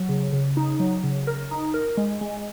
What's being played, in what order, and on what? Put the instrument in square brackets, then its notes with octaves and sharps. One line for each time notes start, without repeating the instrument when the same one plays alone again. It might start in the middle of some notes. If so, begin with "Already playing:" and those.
Already playing: [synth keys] F#3
C#3
C#3
D#4
F#3
C#3
A#4
D#4
A#4
G#3
G#3